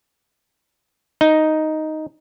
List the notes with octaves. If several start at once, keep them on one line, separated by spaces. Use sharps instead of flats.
D#4